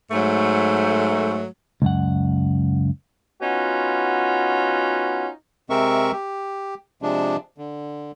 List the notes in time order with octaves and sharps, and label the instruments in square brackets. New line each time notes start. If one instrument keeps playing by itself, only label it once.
[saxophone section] G#2 F#3 A3
[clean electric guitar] C#2 F#2 F#5
[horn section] B3 C#4 D#4 F4 F#4
[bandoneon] C3 G#3 C4 A#4 E5 C#6
G4
C3 F3 G#3 D4
D3